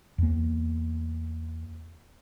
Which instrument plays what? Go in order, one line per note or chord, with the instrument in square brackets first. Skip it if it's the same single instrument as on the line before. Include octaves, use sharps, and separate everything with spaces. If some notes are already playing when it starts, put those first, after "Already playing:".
[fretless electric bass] E2 A#3